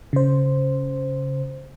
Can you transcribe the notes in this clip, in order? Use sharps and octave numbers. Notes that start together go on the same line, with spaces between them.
C#3 C5